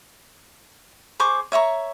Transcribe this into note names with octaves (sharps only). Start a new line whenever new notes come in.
G#4 C5 C#6 D6
C#5 E5 A#5 C#6